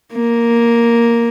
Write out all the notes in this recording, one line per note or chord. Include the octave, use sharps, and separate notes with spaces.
A#3